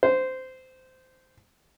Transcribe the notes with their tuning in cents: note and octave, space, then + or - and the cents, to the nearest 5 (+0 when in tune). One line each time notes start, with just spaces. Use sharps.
C5 -15